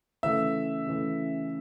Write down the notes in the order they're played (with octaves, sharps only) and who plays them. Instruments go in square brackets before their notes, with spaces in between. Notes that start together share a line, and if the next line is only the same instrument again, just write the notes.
[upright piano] C#3 E3 A3 [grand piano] E5 E6
[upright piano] C#3 E3 A3